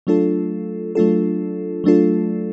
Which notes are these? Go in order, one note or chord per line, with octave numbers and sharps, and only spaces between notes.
F#3 A3 D4 F4 A4
F#3 A3 D4 F4 A4
F#3 A3 D4 F4 A4